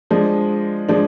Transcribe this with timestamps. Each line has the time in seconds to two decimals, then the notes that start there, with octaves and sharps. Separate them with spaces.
0.11 F3 G#3 D4
0.89 F3 G#3 D4